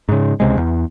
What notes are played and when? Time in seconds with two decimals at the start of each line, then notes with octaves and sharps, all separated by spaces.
0.09 G#2 C#3
0.40 C#2 C3 G#3
0.57 E2